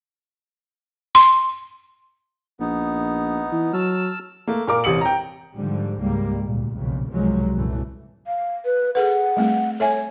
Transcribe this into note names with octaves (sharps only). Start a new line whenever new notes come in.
C6
A#1 B3 D#4
E3
F#3 A5 E6 F6
A3 A#3
A#2 A#4 D6
A1 C3 D#6 C#7 F#7
G5 A#5
G#2 D3 F3 G3
C#2 G#2 G3 G#3 A#3
D2 A#2
B1 F2 A#2 C#3
C2 G#2 B2 F3 F#3 G#3
C2 F#2 A#2 E3 A3
F5
B4
G#4 A4 B4 F#5
G3 A3 C4
A4 C#5 E5 G#5